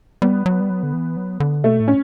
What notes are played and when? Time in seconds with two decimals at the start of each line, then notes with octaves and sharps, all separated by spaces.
0.22 G3 B3
0.46 F#3
0.60 G3
0.70 F#3
0.83 D3
0.93 E3
1.17 F#3
1.40 D3
1.64 B2 A3
1.80 A2
1.88 C#4